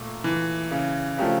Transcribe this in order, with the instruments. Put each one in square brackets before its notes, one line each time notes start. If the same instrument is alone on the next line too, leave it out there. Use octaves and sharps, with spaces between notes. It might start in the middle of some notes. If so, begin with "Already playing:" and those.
Already playing: [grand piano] A#2 A3
[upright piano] E3
C#3
[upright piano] C#3 [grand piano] F3 A3 D4 G4 A#4